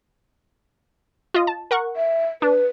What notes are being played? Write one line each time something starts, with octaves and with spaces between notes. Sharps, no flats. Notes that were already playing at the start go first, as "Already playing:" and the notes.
F4 D#5
A5
A#4 F#5 C#6
E5
D4 B4